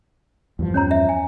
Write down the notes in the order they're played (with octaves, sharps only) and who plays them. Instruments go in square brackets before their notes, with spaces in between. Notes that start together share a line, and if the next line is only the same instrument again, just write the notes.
[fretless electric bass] E2 G2 F3
[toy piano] C#4 C#5 A#5
E5
G#5